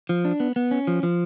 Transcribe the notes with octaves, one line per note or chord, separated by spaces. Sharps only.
F3
D4
B3
B3
C#4
F3
F3